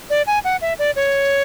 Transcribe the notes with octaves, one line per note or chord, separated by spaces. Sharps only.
D5
G#5
F#5
E5
D5
C#5